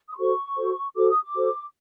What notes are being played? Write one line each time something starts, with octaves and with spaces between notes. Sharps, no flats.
D#6
C6
F#4 A4 C5 C#6
F#4 A4 C5
F#4 A4 C5 D6
D#6
D6
F#4 A4 C5